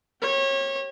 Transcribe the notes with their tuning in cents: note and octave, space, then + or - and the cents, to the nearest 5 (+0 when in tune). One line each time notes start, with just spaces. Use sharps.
G4 -10 C#5 -30